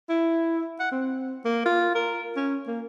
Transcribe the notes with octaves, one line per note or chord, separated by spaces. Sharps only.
E4
F#5
C4
A#3
F4
A#4
C#4
A#3